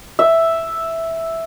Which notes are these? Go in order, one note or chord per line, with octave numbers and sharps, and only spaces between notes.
E5